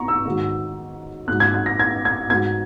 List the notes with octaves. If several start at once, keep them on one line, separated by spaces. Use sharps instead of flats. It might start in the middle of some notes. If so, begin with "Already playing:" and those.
Already playing: E2 A#5 C#6
E6
G#2 D#3 F#3
G#2 F#3 F#6
G#6
G#6
A#6
G#6
G#6
G#2 F#3 G#6